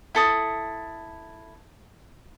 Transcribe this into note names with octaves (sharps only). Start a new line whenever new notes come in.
E4 A4 D#6